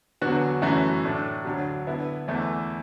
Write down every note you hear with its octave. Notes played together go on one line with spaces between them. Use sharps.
E2 D3 F#3 B3 F#4
F#2 E3 A3 F#4
A2 A3 D4
D2 D3 F#3
D3 B3 E4
E2 E3 A3